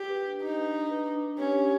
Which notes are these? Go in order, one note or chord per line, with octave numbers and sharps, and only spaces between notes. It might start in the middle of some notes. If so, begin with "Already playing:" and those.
Already playing: G4
B4
D4
D4 D#4
D4
D4
B4
D4
D4
C#4 G4
G4